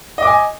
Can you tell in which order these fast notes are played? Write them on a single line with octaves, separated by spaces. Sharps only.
D#5 D6 G#5